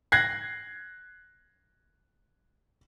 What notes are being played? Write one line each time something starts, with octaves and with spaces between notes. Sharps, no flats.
F#6 G#6 A#6 C7